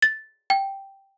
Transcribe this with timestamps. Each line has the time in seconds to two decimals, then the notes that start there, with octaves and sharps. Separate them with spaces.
0.02 A6
0.50 G5